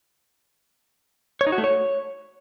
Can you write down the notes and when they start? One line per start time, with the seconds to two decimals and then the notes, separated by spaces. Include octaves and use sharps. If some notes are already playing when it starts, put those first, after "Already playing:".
1.41 C#5
1.47 D#4
1.52 F#4
1.58 A3
1.64 C#5